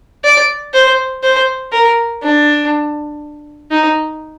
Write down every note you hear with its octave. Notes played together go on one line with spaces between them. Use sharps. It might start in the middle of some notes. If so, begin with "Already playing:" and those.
D5
C5
C5
A#4
D4
D#4